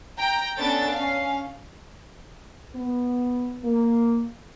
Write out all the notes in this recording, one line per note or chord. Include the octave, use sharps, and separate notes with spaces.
G5 A#5
B3 C#4 D4 A4 A6
C#4 F5
B3
A#3